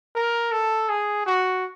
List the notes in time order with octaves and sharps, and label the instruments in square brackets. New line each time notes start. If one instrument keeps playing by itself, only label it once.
[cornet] A#4
A4
G#4
F#4